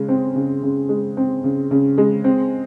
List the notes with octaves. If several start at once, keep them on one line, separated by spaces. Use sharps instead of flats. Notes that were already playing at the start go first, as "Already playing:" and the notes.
Already playing: C#3 G#3
C4
C#3
C#3
G#3
C4
C#3
C#3
G#3
C4